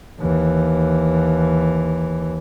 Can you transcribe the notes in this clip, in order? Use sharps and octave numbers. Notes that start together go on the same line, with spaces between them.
D#2 E3